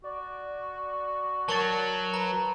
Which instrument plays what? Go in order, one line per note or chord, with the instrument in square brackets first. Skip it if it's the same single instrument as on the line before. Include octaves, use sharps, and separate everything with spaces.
[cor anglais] F#4 [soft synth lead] D5
[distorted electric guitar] F#3 [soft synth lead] A#4 [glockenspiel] A5 C#6 A6
[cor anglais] B4 [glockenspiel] A#5